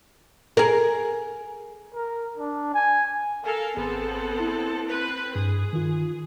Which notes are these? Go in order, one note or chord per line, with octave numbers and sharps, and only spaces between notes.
G#4 A#4
A#4
D4
G#5
A4 A#4 F5 G#5
G#1 B3 C4 G#4 A4
E4
C4 B4
G2 G#4
D#3 F4